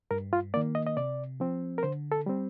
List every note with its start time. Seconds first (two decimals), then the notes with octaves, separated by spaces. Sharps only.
0.11 G2 A#4
0.33 F4
0.54 D#3 A#3 D5
0.75 D#5
0.87 D#5
0.97 C3 D5
1.40 F3 C4
1.78 A#4
1.83 D3 C5
2.12 A4
2.26 G3 C4